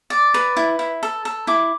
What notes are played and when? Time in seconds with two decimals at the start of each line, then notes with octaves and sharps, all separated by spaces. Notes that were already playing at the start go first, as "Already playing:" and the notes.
0.10 D5
0.34 B4
0.57 E4
0.79 E4
1.03 A4
1.25 A4
1.47 E4 D6